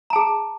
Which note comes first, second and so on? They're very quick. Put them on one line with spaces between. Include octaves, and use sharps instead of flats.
A#5 A5 G#4